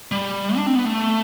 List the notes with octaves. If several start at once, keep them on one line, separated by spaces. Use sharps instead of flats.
G3
D4
C4
B3
A3